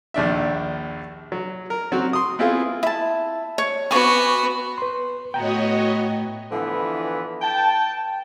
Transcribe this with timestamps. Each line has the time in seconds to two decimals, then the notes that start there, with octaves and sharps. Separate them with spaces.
0.14 A#1 D#2 D4 E5
1.32 F#3
1.70 A#4
1.92 F#3 C4 F#4
2.13 C6 D#6
2.39 B3 C4 E4 F4 G#4
2.83 E4 A5
3.58 C#5
3.91 B3 F#4 G#5 C#6 D6
4.78 B4 C6
5.34 A2 B3 F#4 C#5 D#5 G5 A#5
6.52 D3 E3 F3 B3 E4 B4
7.42 G5 A5